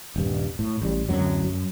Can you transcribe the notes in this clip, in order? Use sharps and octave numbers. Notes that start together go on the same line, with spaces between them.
D#1 G2
A2
A1 G3
D1 G#1 F#2 F#3
F#2